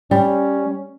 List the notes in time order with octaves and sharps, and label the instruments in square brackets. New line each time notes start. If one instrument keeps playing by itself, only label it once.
[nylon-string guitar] G3 [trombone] C#4